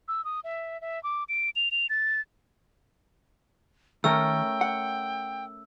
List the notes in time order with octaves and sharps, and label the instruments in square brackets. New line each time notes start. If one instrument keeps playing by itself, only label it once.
[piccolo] E6
D#6
E5
E5
D6
D7
F7
F7
A6
[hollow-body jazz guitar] D#3 [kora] A3 C#4 A#4 [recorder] G5 [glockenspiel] E6
[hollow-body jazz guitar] F#5